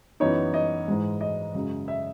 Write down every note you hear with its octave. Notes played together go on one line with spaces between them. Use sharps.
F#2 E3 B3 D#4 C#5
D#5
G#2 E3 G#3
D#5
F#2 C#3 G#3
E5